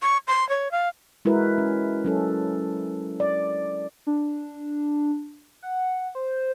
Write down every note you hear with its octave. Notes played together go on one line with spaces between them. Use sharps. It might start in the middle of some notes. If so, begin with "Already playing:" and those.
C#6
C6
C#5
F5
G#3 E4 F#4 A#4 B4
C#4
F#3 C#4 A4
D5
D4
F#5
C5